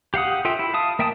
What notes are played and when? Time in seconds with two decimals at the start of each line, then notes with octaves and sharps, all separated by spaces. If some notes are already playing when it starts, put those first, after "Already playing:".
0.14 G4 F5 F#5 D#6
0.45 F4 A4 E5 G5
0.59 E4
0.74 F5 A5 D#6
0.99 A#3 E5 G5 A5 D#6